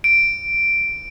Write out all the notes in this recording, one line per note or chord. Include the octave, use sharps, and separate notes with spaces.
D7